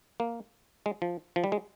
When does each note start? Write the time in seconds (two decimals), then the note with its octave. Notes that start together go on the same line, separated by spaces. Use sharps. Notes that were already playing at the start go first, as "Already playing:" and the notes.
0.20 A#3
0.86 G#3
1.02 F3
1.36 F3
1.44 G3
1.52 G#3